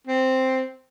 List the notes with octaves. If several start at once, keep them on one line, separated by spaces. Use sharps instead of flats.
C4